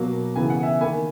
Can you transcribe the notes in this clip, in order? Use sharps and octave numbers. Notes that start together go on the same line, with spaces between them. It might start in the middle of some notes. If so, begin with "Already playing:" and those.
Already playing: B2 F#3 A#3
C#3 E3 B3 G#5
F#5
E5 G#5
D#3 A#3 G#5 B5